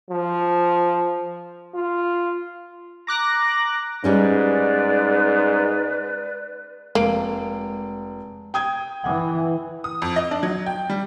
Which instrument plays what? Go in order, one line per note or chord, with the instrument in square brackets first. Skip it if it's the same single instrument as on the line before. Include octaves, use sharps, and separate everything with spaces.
[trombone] F3
F4
[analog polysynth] A#5 D6 F#6 A#6
[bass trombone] G#2 [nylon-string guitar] G3 C#4 D#4 [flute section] B4 D5
[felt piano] F1 D7 [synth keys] G#3 [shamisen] A#3
[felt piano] G5 D#6 G#6
[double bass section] E3 [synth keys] F#5 G#5 D6
[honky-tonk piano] D#6
F2
D#5
D4
F#3
G5
G3